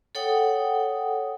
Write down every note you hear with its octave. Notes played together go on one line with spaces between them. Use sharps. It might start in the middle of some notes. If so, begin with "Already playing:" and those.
A4 C#5 F#5 G5 D#6